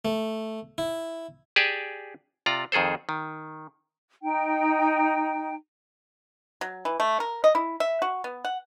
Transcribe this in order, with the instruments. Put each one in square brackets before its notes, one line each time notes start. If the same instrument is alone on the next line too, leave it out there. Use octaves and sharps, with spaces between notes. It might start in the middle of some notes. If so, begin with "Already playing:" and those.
[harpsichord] A3
E4
[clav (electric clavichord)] G4 G#4 D5 G#5 A5
C3 F4 D5 A#5
F2 D#3 G#4 A4 C5
D#3
[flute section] D#4 G5
[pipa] F#3
E3
A3
A#4
D#5
E4
E5
F#4
B3
F#5